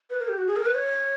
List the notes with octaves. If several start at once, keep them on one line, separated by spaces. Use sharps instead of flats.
B4
A#4
G4
F#4
G#4
A#4
B4
C#5